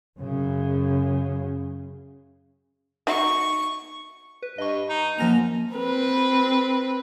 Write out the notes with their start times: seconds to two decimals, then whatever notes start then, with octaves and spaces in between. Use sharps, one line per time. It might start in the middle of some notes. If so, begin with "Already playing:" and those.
0.16 F#2 C#3
3.07 D#4 F#4 E5 C#6
4.42 B4
4.58 G2 D#5 C#6
4.89 D#4
5.18 F#2 F3 A#3 A#6 F7
5.74 C4 B4